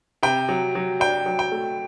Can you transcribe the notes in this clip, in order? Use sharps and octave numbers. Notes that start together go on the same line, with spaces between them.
C3 G5
F#3
F#3
D4 G5
F#3
G5
A3